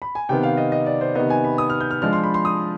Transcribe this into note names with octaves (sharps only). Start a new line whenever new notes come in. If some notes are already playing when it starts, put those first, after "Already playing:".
B5
G#5
C3 D#3 B3 G5
F5
D#5
D#5
D5
C5
C3 D#3 B3 D#5
G#5
B5
D#6
F6
G6
F6
F3 G#3 D4 F4 F6
C6
B5
C6
D#6